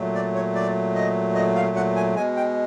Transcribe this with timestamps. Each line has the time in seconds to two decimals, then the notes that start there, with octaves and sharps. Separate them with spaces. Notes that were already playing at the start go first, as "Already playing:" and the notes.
Already playing: A#2 F#3 A3
0.15 D5
0.35 C#5
0.55 D5
0.95 D#5
1.34 D#5
1.55 F5
1.76 F#5
1.96 G#5
2.15 B2 G#3 G#5
2.36 G5